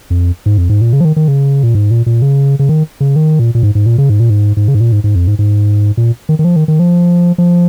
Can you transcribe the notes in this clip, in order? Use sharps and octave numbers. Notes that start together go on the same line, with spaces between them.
F2
G#2
F2
G#2
A#2
C#3
F3
D#3
D#3
C#3
A#2
G#2
A#2
A#2
C#3
C#3
D#3
C#3
D#3
A#2
A#2
G#2
G#2
A#2
C#3
G#2
A#2
G#2
G#2
C#3
G#2
A#2
G#2
G#2
F2
G#2
G#2
A#2
D#3
D#3
F3
D#3
D#3
F3
F3